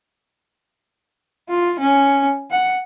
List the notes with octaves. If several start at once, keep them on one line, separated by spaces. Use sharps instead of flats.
F4
C#4
F#5